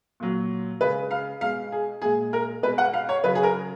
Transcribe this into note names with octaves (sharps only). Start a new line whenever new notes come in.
A#2 F#3
C#3 G#3 B4
F5
B2 G#3 F5
G#4
A#2 G#3 G#4
A#4
B2 G#3 B4
F#5
F5
C#5
C#3 F#3 B4
G#4
A#4